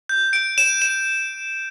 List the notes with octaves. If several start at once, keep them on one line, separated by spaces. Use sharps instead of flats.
G6
D7
E7
E7